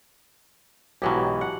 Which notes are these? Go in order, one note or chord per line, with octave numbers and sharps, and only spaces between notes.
B1 G#2 B2 E3 F#3 G4
F#5